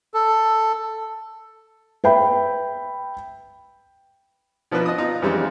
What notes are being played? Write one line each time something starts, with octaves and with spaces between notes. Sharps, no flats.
A4
B4 E5 G5 B5
B2 F3 D4 D#4 B4
D#5 D#6
D#4 F4
F2 E3 G3 G#3 C4 D4